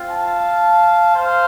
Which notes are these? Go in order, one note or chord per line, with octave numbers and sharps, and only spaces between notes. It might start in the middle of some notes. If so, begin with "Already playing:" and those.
Already playing: C4 F4
F5 A5
C5 F5